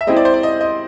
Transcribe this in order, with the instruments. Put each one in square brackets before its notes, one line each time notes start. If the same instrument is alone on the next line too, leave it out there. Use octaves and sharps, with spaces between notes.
[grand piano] E5
[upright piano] G#3 C4 E4 G#4 [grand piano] D#5
[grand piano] D5
C5
D5
D#5
D#5